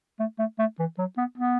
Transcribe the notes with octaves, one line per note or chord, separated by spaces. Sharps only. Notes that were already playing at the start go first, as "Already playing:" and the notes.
A3
A3
A3
E3
F#3
B3
B3